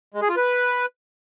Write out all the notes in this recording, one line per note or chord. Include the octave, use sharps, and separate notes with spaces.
G#3
G#4
F4
B4